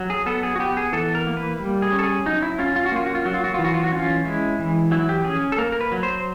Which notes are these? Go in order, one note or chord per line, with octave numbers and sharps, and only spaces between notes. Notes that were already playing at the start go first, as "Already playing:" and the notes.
Already playing: F#3
G#4
B3 A4
G#4
F#4
B3 G4
G#4
E3 A4
A#4
A#3
B4
G3
G#4
C#4
A4
G#4
F#3 D#4
E4
C#4 F4
F4
F#4
A#3 F4
F#4
F4
F#3 F#4
F4
F#4
E3 F4
F#4
F4
F#4
C#4 F4
G#3 E4
E3
F#3 E4
G4
C#4 G#4
A4
A#3 A#4
A#4
B4
F#3
C5